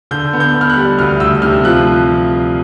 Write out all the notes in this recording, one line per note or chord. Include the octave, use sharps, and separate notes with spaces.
D3 G6
B3
G6
B3
F6
F#6
G3
D2 F6
D2 E6
C3 F6
F3 F#6